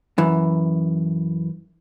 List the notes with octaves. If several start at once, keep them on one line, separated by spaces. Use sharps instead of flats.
F#2 E3